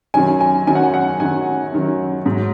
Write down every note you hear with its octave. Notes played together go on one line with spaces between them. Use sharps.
F#2 D#3 F#3 G#5
G#5
F#2 D#3 F#3 G#5
F#5
G#5
F#5
F#2 D#3 F#3 G#5
F#2 D#3 F#3
G#2 F#3